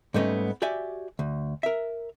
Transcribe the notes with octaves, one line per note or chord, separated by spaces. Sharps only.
G#2 G3 A3 B3 C#4 D#5
F#4 G4 D5 E5 G#5
D2
A#4 E5